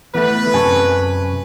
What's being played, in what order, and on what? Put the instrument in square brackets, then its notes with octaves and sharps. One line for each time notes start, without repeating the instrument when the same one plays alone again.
[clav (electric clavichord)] E3 A3 [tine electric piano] B3 [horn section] B4
[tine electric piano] F#2 [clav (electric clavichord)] C3 [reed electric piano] G#5 A5 C#6